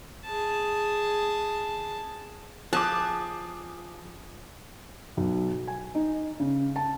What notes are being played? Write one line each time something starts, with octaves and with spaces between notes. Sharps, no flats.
G#4 A5
F3 G#4 A5 D6 D#6 F#6
B1
G#5
D#4
C#3
A5